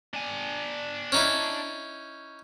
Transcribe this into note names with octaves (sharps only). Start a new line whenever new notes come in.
D4 G#5
C#4 D#4 E4